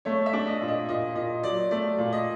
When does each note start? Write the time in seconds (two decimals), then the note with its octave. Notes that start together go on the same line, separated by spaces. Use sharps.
0.05 A3 C#5
0.26 E5
0.33 D4
0.47 D#5
0.61 A#2
0.68 D#5
0.89 A#2 D#5
1.16 A#2 D#5
1.43 F#3 D5
1.71 A3 D5
1.98 A#2
2.12 D#5